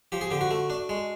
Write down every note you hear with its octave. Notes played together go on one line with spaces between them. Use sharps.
F3 G4
G#4
D3 G4
F#4
A3
D4
G#3